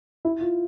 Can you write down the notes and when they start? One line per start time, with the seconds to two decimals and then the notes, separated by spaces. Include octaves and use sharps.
0.25 E4
0.41 F4